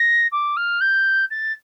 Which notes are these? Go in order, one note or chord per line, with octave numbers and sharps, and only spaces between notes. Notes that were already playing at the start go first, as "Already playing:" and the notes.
Already playing: A#6
D6
F6
G6
A6